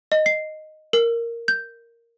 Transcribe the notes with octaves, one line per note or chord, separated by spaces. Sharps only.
D#5
C7
A#4
G6